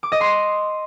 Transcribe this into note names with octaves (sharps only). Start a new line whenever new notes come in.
D6
D#5
C6